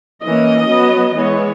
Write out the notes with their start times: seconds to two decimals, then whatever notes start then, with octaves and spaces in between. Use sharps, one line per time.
0.23 E3 A#3 C#4 D#5
0.70 F#3 B3
1.16 E3 G#3 B3 C#5